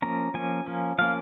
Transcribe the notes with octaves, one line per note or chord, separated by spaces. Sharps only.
F3 A#3 C#4 A#5
F3 A#3 C#4 G#5
F3 A#3 C#4
F3 A#3 C#4 F5